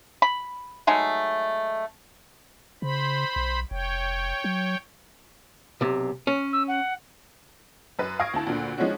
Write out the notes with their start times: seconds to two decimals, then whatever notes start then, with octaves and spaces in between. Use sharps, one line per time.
0.22 B5
0.87 F#3 G#3 A3 D#4
2.82 C#3 C5 B5
3.36 B1
3.71 F1 C#5 G5
4.44 F#3
5.81 B1 C3
6.27 C#4
6.53 E6
6.68 F#5
7.99 F#2 B4
8.20 F5 C#6 D#6 G#6 A#6 D7
8.34 D2 E4 A5
8.47 D2 A#2 D3
8.78 F3 G#3 C#4 D4 E4 F#4